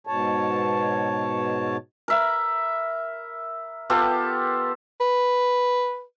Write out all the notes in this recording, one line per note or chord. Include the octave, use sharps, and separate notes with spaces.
G#2 B2 C#5 A5
A#4 E5 B5
B3 F4 G4 A4
B4